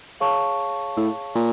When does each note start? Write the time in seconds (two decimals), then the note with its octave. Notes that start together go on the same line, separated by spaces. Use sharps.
0.20 G#4 C#5 F5 A5 C#6
0.97 A2
1.35 A#2